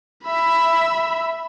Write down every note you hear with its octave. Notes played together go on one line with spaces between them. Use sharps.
E5 B5